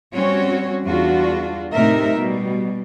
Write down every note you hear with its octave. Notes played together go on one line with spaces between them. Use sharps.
G3 C4 C#4 F#4 C#5
E2 G3 D4 F4 F#4
A2 C3 A3 D#4 A#4 E5
B2 G3